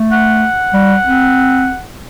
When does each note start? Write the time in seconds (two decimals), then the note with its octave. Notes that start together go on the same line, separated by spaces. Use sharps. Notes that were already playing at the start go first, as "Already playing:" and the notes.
Already playing: A3
0.12 F#5
0.74 G3
1.06 C4